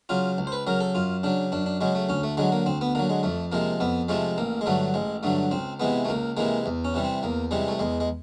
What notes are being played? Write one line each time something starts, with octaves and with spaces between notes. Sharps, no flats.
C#3 F#3 F4
C#2
C5
B4
C#3 F#3 A#4
A4
F#2 F4
C#3 F#3 D4
F#2 D4
D4
C#3 F#3 G#3
A3
D2 C#4
A3
D3 F#3 G#3
A#3
D2 C4
B3
D3 F#3 A#3
G#3
F2 A3
C3 F3 G#3 A#3
F2 B3
C3 F3 G#3 A3
A1 A#3
G#3
G2 D3 F#3 A3
A1 G#3
G2 D3 F#3 A3
C#2 C4
C3 E3 G#3 B3
A3
C#2 A#3
C3 E3 G#3 A#3
E2
C#4
C3 E3 G3
C4
E2 A#3
C3 E3 G3 G#3
A3
E2 G#3
G#3